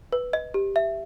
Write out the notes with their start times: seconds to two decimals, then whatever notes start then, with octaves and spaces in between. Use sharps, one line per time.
0.13 B4
0.33 D#5
0.54 G4
0.76 E5